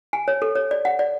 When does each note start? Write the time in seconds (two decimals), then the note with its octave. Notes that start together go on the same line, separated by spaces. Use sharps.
0.13 G#5
0.28 C#5
0.42 A4
0.55 C#5
0.71 D5
0.85 F#5
0.99 D5